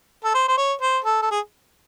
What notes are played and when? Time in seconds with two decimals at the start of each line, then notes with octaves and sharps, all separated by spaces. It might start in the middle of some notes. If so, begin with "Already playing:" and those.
0.24 A4
0.34 C5
0.48 C5
0.57 C#5
0.81 C5
1.04 A4
1.22 A4
1.31 G#4